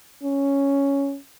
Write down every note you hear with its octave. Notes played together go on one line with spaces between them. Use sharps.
C#4